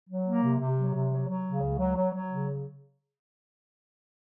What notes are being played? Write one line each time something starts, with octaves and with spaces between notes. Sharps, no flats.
F#3
A#3
C3
C3
F#3
C3
F#3
F#3
C#3
C#2
F#3
F#3
F#3
C#3